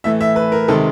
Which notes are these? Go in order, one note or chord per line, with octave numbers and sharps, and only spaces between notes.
A2 E3 A3 E5
E5
B4
A#4
C3 D#3 G#3 A4